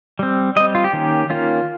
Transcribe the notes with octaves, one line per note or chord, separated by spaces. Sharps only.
G3 C4
G3 C4 D#5
F4
G4
D#3 A#3 C#4
D#3 A#3 C#4 F4